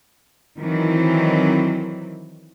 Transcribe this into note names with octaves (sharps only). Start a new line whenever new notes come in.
D#3 E3 F#3 C4